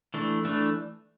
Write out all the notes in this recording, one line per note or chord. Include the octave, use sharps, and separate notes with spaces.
E3 A3 D4
E3 A3 D4